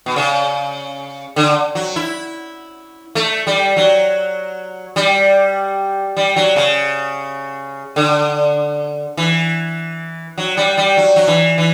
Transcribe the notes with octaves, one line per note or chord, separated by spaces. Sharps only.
B2
C#3
D3
F#3
E4
A3
G3
F#3
G3
G3
F#3
C#3
D3
E3
F#3
G3
G3
F#3
F#3
E3
E3